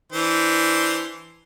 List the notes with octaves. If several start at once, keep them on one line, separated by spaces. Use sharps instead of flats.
E3 D4 C5